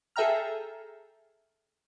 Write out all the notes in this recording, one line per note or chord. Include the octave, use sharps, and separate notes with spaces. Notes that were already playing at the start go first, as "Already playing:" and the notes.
G#4 A4 E5 G5 A#5 F6